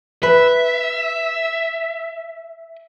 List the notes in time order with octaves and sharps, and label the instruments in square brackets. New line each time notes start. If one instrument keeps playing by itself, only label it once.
[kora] B4 [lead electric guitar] E5